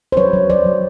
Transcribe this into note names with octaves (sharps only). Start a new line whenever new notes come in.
C5
F#3 B4 C#5
F#3
F#3 C5 D5
F#3